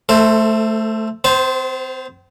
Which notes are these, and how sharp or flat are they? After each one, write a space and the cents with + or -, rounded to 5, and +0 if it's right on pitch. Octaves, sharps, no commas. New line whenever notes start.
A3 +0 A4 +30 C5 +0
C4 -40 C5 +0 A5 -30